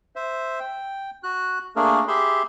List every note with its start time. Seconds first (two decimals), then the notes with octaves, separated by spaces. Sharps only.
0.16 C5 E5
0.60 G5
1.23 F#4 F#6
1.76 A3 A#3 D4 G#4 A#4
2.08 G4 G#4 E5 B5 C6